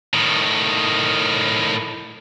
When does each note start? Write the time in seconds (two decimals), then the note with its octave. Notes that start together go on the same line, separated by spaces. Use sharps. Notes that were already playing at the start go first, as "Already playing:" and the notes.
0.13 A2 D#3